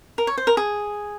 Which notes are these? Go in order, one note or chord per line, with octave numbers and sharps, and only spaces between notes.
A#4
C#5
C5
A#4
G#4